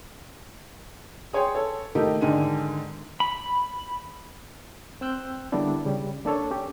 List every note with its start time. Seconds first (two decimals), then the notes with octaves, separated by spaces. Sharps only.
1.33 G#4 C#5 G5 C6
1.55 A4 C#5
1.95 D#3 A3 A#3 D#4 G4 A4
2.21 G#2 D3 D#3 D4 G#5 D#7
3.20 B5
5.01 C4 G5 E6 F#6 G6
5.52 D3 G3 A#3 B3 D4 E4
5.85 C#3 G3
6.25 A#3 D4 A4 C#5
6.51 C#4 G4